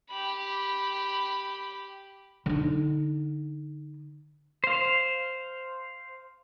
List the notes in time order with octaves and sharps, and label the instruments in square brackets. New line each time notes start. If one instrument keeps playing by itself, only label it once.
[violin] G4 B5
[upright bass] D3 D#4
[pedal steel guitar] C5 F5